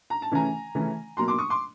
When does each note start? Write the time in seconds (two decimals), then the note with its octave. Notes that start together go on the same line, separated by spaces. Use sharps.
0.10 A#5
0.22 A5
0.31 C#3 E3 A3 C#4 G#5 A#5
0.75 C#3 E3 A3 C#4
1.17 B2 F#3 A#3 A#5 C6
1.28 C6 D6
1.38 C#6 D#6
1.50 C6 D6